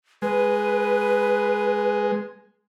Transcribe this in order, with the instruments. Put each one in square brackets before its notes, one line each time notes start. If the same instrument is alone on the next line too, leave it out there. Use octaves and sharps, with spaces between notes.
[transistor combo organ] G#3 [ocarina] B4